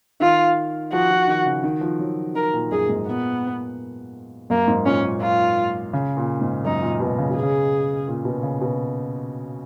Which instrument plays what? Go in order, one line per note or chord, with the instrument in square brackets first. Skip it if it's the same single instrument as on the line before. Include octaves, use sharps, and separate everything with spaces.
[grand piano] D#3 [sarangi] F4
[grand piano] F3 [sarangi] F#4
[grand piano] F3
D#3
C#3
D#3
F3
F#3
[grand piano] D#3 [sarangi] A#4
[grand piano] A#2
[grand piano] F#2 [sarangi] G#4
[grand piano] G#2
[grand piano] A#2 [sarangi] B3
[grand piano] F#2 [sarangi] A#3
[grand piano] G#2
[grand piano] A#2 [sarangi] C#4
[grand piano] A#2
[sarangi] F4
[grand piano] C#3
A#2
G#2
[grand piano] F#2 [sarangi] D#4
[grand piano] A#2
B2
C#3
B2
[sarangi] G#4
[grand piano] C#3
A#2
B2
C#3
B2